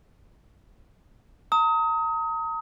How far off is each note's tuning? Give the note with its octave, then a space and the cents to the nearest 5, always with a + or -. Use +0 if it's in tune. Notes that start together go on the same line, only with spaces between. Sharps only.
A#5 -35 D#6 +30